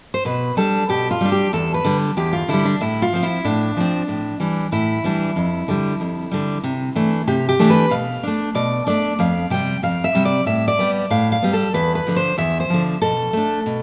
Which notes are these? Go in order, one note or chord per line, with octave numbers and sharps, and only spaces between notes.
C5
B2 B4
G3 D4 A4
B2 G4
F4
G3 D4
G4
E2 A4
B4
D3 G3
E2 G4
F4
D3 G3 E4
D4
A2 E4
F4
F3 C4
E4
A2 D4
F3 C4
A2
E3 G3 D4
A2 E4
E3 G3 D4
F2
D3 G3
F2
D3 G3
C3
E3 A3 D4
C3 G4
G4
E3 A3 D4
B4
B2 F5
A3 D4
B2 D5
A3 D4 D5
F2 F5
C3 G3 G5
F2 F5
E5
C3 G3
D5
A2 E5
D5
G3 B3
A2 F5
F5
G3 B3
A4
E2 B4
B4
D3 F3
C5
E2 E5
C5
D3 F3
B2 A4
A3 D4
B2